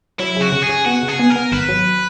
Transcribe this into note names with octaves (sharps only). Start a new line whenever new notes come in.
F#3 E4
C#3 F#4
C#3
G#4
C#3
B3 F#4
C#3
G#4
B3
A#4
B3
G#1 B4
F#3